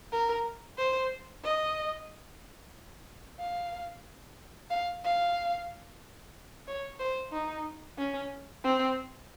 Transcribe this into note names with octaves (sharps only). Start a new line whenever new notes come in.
A#4
C5
D#5
F5
F5
F5
C#5
C5
D#4
C#4
C4